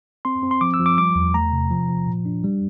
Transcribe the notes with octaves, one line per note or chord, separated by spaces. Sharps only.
C4 C6
C4
C6
F3 D6
E6
F3
D6
G3 D6
E2
A3 A#5
C3
F3
F3
A#2
D4
G3